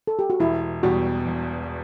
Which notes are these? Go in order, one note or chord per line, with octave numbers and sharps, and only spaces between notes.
A4
G4
F#4
E1 E4
E2 B2 G3 F#4
E1